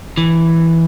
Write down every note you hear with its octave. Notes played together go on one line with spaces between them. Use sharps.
E3